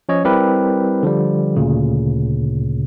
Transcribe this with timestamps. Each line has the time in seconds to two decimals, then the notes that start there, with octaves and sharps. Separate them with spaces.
0.09 F3 C#4 C#5 D#5
0.24 G3 C4 E4 G4 A#4 B4
1.03 D3 F3 G3
1.56 D2 A#2 C#3